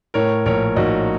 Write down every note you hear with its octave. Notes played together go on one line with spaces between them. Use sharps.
A2 A#4 C#5
A#1 A#4 C#5
A#1 D#4 F#4